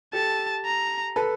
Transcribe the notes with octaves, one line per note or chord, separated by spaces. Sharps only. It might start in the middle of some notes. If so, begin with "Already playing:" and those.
G4 A4 A5
A#5
A4 B4